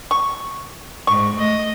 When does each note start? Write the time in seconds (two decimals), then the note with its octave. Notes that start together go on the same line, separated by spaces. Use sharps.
0.11 C#6
1.07 G#2 C#6
1.36 A3 D#5